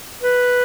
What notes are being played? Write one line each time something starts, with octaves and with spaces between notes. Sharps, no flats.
B4